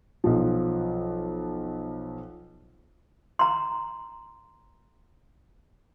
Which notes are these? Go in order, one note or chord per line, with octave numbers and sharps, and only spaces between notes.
B1 F3
A#5 C6